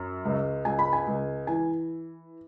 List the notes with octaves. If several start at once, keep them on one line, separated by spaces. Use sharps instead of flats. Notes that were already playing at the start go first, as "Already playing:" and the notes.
Already playing: F#2
C#2
C#2 G#5
B5
G#5
C#2
E3 G#5